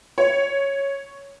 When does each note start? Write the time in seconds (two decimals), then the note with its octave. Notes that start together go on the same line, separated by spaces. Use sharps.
0.18 C#5